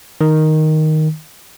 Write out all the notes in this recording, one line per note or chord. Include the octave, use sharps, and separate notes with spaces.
D#3